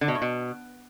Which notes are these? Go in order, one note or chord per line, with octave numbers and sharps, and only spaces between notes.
D3
B2
A2
B2